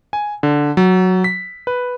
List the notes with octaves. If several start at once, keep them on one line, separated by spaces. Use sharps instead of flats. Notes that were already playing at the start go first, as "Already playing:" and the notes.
G#5
D3
F#3
B6
B4